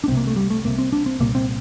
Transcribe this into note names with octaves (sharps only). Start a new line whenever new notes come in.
D4
C2 C3 A#3 C4
A3
G3
A3
C2 C3 A#3
C4
D4
C4
C2 A#2 A#3
C4